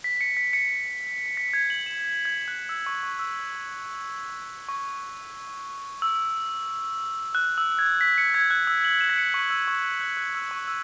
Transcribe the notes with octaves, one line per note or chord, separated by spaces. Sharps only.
B6
C#7
B6
C#7
B6
G#6
F#7
E7
G#6
F#6
E6
C#6
C#6
E6
C#6
E6
F#6
E6
G#6
B6
C#7
G#6
F#6
E6
F#7
E7
B6
C#7
C#6
E6
C#6
F#6
F#6
F#6
E6
C#6
E6